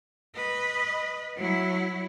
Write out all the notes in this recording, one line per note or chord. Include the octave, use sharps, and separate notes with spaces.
B4 D#5
F#3 E4